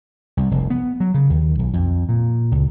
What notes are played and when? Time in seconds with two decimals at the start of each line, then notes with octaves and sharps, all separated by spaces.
0.37 C2
0.51 F1
0.70 B3
1.00 F#3
1.14 C#3
1.30 D#2
1.59 B1
1.73 F2
2.09 A#2
2.52 C#2